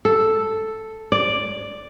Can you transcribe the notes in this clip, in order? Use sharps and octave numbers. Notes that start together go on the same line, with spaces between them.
A4
D5